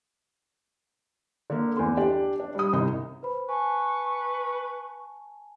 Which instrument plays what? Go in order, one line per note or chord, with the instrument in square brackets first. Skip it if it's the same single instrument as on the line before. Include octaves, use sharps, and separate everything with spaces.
[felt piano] D3 A#3
E2 A3 C6
D4 G4 D5
D4
G3 D#6
C2 D#4 D#5
[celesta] B4 C5 B5
[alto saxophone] B4 [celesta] G#5 A5 [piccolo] C#6